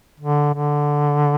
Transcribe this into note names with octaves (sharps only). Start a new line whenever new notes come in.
D3
D3